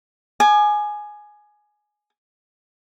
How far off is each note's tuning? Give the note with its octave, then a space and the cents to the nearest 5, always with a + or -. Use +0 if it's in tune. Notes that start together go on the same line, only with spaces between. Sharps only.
G#5 +10 D6 +45